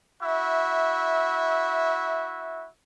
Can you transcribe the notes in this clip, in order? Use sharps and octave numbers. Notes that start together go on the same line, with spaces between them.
E4 F#4 E5